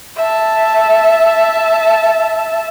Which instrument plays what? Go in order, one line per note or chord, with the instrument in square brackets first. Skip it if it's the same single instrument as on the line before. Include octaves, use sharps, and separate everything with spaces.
[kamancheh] E5 A5